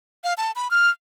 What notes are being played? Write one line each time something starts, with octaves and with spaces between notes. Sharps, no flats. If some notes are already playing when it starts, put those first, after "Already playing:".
F5
A5
B5
F6